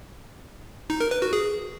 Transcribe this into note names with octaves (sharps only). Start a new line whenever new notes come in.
D#4
A#4
B4
F#4
G#4